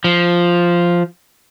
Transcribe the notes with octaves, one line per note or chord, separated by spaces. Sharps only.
F3